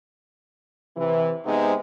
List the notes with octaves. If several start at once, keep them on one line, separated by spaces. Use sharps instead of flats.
C3 E3
C3 G#3 B3 D#4 C5